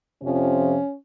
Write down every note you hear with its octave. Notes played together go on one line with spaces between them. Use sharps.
F2 C3 F3 C#4